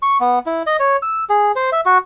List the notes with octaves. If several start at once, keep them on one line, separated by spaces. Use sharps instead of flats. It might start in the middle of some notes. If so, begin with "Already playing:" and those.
C#6
B3
E4
D#5
C#5
E6
G#4
C5
E5
F#4